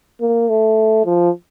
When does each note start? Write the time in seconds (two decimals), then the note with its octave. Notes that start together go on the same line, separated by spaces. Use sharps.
0.21 A#3
0.49 A3
1.05 F3